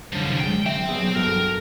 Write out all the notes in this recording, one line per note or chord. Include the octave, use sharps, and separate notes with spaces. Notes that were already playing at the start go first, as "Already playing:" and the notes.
C2 F#2 D3 F3 G3
F#3 G#3 G5
C4 E5
F#3 B3 G#4
G2 F#4 A4 A#4